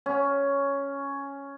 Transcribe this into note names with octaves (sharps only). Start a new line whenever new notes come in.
C#4